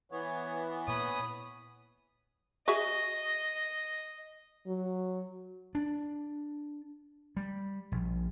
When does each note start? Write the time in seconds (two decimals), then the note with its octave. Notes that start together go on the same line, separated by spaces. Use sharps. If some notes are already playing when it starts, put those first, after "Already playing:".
0.12 E3 B3 C#5
0.88 A#2 C#5 B5 D#6
2.68 F#4 G#4 D#5 E5
4.67 F#3
5.75 D4
7.37 G3
7.92 A#1